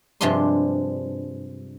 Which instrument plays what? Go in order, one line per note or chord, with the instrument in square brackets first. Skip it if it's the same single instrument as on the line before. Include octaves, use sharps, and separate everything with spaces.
[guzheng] G2 C3 F3 G#3 D4 C6